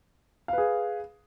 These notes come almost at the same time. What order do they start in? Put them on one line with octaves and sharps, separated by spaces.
F5 B4 G#4